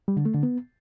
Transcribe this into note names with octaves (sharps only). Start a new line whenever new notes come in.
G3
D3
A3
D3
B3